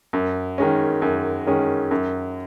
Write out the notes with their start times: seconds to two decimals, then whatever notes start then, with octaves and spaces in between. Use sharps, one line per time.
0.13 F#2
0.58 D#3 G#3 C#4
1.02 F#2
1.47 D#3 G#3 C#4
1.91 F#2